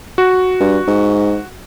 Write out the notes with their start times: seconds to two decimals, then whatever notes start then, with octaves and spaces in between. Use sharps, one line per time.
0.18 F#4
0.60 G2
0.88 G#2